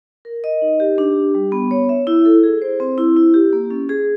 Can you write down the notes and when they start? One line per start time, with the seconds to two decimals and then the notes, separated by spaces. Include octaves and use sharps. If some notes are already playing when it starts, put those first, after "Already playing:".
0.25 A#4
0.44 D#5
0.62 D#4
0.80 G4
0.98 D4
1.16 G4
1.35 G3
1.52 B3
1.71 C#5
1.89 E5
2.07 E4
2.25 A4
2.43 G#4
2.62 C5
2.80 C4
2.98 E4
3.16 E4
3.34 G4
3.53 A#3
3.71 C#4
3.89 G#4